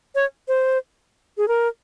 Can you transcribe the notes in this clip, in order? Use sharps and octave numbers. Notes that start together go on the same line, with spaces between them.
C#5
C5
G#4
A#4